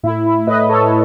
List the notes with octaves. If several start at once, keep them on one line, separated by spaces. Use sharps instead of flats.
A2 E4
E4
A2 B4 D#5
A4 C#5